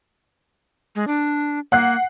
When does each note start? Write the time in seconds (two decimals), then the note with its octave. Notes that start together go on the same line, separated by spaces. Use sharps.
0.95 G#3
1.08 D4
1.72 A#3 F#5 F#6 C7